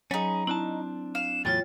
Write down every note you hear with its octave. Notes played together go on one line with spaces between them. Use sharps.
F#3 C#4 D#4 G#4 B5
C4 D4 E4 A5
F5 E7
E2 A2 F#3 F4 C#5 G5 A6